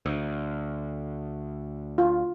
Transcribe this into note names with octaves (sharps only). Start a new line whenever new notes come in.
D2
F4